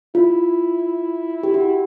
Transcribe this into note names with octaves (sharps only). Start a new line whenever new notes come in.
E4 F4
G4
F#4